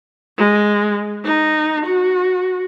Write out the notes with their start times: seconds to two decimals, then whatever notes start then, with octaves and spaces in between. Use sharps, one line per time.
0.38 G#3
1.25 D#4
1.86 F#4